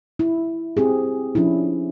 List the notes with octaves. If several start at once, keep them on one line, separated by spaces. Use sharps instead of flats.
E4
C4 G4 G#4
F3 C#4 D4 E4